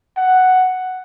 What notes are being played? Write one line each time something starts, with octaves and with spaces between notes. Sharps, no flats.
F#5